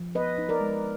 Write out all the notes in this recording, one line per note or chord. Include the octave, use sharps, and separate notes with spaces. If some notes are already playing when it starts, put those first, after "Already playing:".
Already playing: F3
B3 B4 D#5
D#4
A#4 D5
G#3